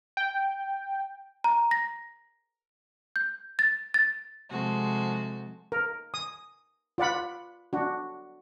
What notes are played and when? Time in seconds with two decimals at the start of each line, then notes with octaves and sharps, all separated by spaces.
0.17 G5
1.44 A#5
1.71 A#6
3.16 G6
3.59 A6
3.94 A6
4.50 C3 F3 G#3 F#4 A4
5.72 A#4
6.14 D#6
6.98 F4 D5 F#5 B5
7.73 D4 F#4